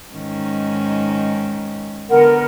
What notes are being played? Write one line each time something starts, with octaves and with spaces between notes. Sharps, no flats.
G#2 D#3 C#4
D3 B3 A#4 F#5